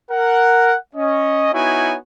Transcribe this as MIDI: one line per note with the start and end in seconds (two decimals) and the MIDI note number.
0.11 0.75 70
0.11 0.75 78
0.95 1.49 61
0.95 1.49 75
1.53 1.96 59
1.53 1.96 63
1.53 1.96 64
1.53 1.96 66
1.53 1.96 73
1.53 1.96 80